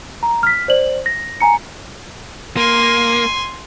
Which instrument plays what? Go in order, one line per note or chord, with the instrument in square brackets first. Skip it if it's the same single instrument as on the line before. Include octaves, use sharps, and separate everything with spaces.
[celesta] A#5
F6 B6
C5 D5 F#7
A#6
G#5 A#5 C#7
[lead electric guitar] A#3 [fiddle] G#5 C6